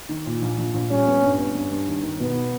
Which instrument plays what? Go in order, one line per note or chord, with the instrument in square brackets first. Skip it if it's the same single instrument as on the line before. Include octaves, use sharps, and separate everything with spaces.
[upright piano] D#3
A#2
A#1
A#1
A#1
[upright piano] G3 [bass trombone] C#4
[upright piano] B3
G2
B3
G2
G2
D#3
D#3
[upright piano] B2 [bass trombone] B3